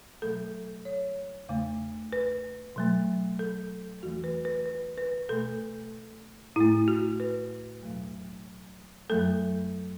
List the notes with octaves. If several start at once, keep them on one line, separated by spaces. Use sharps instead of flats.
B2 F#3 A3 A4
C#5
E2 C#3 A3
B4
B2 F#3 A3
A4
E2 E3 A3 F#4
B4
B4
B4
B4
B2 A3 A4
A2 A3 E4
F#4
B4
E2 B2 F#3 A3
F#2 F#3 A3 A4